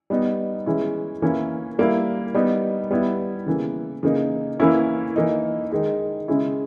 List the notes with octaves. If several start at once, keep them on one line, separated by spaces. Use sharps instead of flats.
G3 B3 D#4
E3 G#3 C#4 E4
E3 A#3 C#4 E4
G3 A#3 E4
G3 B3 D#4
G3 B3 E4
C#3 E3 A#3
C#3 E3 A#3 D#4
E3 A#3 C#4 E4
E3 A#3 D#4
D#3 G#3 D#4
C#3 G#3 C#4 E4